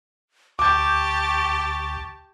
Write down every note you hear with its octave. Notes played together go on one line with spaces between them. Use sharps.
D2 G4 A5 C#6 D6 G6